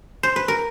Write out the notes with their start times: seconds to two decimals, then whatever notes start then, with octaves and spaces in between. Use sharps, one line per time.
0.23 C5
0.36 B4
0.48 A#4